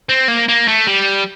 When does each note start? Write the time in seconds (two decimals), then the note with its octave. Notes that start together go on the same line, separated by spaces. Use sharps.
0.09 C4
0.28 A#3
0.48 A#3
0.68 A3
0.87 G3